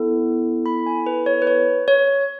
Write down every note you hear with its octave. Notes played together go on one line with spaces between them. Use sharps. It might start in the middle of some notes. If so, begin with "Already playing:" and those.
Already playing: B3 E4 A4
B5
G#5
B4
C#5
B4
C#5
C#5